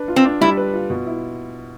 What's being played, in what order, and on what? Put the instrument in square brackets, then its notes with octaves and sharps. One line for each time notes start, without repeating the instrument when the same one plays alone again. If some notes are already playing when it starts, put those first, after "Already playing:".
Already playing: [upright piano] D4 B4
F4
[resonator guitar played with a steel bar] C4
[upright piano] D4
[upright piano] G3 [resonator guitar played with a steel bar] E4
[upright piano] B4
F4
B2
E4